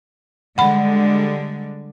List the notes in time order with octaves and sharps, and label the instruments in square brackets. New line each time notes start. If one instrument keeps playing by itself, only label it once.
[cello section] D3 G3 G#3 [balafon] F#5 B5